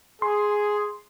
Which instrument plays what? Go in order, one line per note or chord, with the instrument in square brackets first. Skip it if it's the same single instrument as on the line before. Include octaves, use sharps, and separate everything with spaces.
[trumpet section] G#4 [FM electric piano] C6